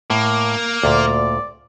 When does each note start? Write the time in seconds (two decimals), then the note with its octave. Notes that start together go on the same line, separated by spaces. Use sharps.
0.10 A2 A#3 D6
0.83 D2 A#2 D5